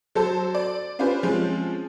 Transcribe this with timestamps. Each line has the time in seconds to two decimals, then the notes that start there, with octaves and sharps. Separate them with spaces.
0.15 F#3 A4 C5 A5
0.55 D5
0.99 C#4 D4 F4 G4 B4 C5
1.23 F3 G#3 C4 C#4